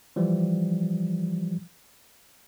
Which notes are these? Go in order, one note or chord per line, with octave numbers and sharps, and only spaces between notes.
E3 F3 G3